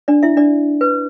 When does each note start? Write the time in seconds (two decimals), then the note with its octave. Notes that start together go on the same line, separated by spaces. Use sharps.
0.08 D4 D5
0.23 E4 E5
0.37 D4 D5
0.81 B4